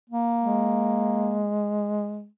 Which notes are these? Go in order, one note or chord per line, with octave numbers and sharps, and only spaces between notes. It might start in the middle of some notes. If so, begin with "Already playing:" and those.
A#3
G#3